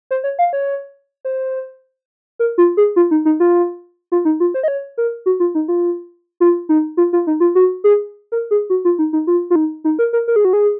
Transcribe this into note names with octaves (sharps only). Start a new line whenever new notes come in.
C5
C#5
F5
C#5
C5
A#4
F4
G#4
F4
D#4
D#4
F4
F4
D#4
F4
C5
D#5
C#5
A#4
F#4
F4
D#4
F4
F4
D#4
F4
F4
D#4
F4
F#4
G#4
A#4
G#4
F#4
F4
D#4
D#4
F4
F4
D#4
D#4
A#4
A#4
A#4
G#4
F#4
G#4